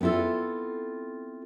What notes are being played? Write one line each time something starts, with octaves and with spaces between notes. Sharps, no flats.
B3 C4 E4 F4 A4